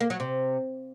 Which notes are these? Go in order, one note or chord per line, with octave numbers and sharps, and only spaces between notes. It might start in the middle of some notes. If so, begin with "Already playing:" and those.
A#3
F#3
C3